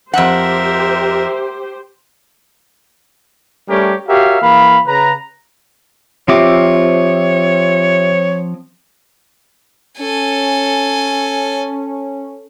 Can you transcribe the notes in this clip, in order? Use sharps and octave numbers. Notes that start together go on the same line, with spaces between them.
F2 G4 A#4 C5 E5 F#5
G3 A3 C#4 G4 A#4 C#5
F#4 G4 A#4 C#5 E5 F5
E3 A#3 F5 B5
C#3 B4 A#5
F3 C4 F4 G4 C#5 E5 D6
C#4 A4 G#5